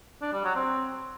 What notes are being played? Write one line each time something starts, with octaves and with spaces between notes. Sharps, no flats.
D4
G3
F#3
C4